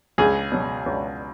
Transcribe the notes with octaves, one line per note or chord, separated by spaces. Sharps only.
C#2 G#4
B2 F#3
C#2